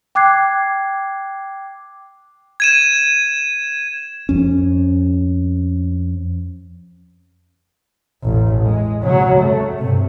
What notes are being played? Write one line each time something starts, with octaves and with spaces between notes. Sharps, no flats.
G5 D6 F#6 G#6 C7
G#6 D#7 E7
F2 C#4
A1 E2
G#3
C#3 F#3
A3
G2 C3